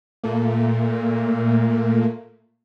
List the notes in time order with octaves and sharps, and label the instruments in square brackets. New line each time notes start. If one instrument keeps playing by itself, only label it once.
[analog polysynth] A#2 A3 A#3